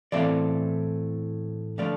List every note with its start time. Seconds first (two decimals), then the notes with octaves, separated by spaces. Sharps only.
0.12 A2 E3 A3 C4 D5 F5
1.78 D3 F3 A3 D5 F5